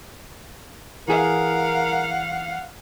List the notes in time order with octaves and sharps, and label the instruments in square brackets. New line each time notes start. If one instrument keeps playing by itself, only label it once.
[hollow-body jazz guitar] E3 G#4 [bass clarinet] A#4 [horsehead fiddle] F5 F#5